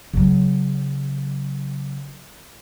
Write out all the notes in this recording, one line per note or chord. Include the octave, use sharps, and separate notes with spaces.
C#3 F#3